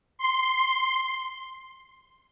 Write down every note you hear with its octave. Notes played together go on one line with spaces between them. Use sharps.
C6
C6